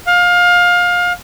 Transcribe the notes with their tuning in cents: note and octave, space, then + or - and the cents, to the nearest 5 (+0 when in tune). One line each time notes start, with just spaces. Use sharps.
F5 +25